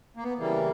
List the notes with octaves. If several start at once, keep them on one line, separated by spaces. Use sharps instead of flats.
A#3
B3
C#3 E3 G3 A#3